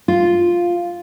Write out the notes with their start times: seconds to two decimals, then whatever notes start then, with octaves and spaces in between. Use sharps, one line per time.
0.08 F4